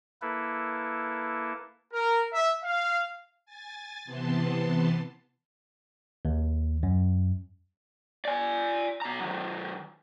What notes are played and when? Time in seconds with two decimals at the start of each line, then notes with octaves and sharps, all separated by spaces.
0.22 A#3 E4 A4 B4
1.93 A#4
2.34 E5
2.64 F5
3.46 G#5 A6
4.05 C3 E3 B3 A5 C6
6.25 D#2
6.83 F#2
8.25 D5 G#5
9.02 B2 A#5
9.20 D#3 F#3